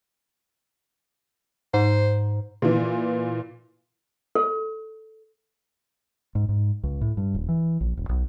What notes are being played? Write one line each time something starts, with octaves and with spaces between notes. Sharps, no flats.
G#2 C5
A#2 E3
A4
G#2
G#2
C#2
A2
G2
D#1
E3
A#1
D#1
B1